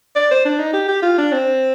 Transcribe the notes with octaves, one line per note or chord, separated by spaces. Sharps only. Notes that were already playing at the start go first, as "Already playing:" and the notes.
D5
C5
D4
D#4
G4
G4
F4
D4
C4